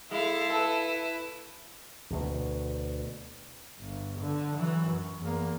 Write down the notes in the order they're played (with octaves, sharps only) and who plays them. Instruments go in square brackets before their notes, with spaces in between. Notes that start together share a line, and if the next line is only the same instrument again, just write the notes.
[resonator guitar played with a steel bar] G#3 [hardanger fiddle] E4 [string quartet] A4 F5
[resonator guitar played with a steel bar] A4 [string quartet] B4
[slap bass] D2 B2
[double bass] G1
D3
E3 F#3
F#2
E2 A#3